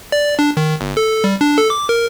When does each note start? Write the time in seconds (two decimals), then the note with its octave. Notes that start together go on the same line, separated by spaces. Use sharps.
0.12 D5
0.39 D4
0.57 D#3
0.81 G1
0.97 A4
1.24 G3
1.41 D4
1.58 A4
1.70 D6
1.89 A#4